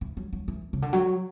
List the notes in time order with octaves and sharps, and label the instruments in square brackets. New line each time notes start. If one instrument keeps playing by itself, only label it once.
[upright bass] E3
F#3
F#3
E3
C#3
D3
F#3